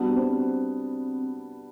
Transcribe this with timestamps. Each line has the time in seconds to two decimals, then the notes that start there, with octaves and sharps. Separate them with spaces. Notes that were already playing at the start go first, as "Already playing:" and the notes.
Already playing: G3 B3 D4 F#4
0.16 C4